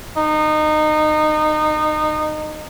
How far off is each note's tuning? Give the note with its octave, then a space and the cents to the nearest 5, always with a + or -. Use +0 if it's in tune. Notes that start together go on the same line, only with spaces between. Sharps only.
D#4 -25